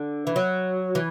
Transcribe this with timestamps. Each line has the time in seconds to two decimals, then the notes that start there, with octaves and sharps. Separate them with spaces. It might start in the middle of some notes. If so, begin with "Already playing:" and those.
Already playing: D3
0.27 E3
0.36 F#3
0.95 E3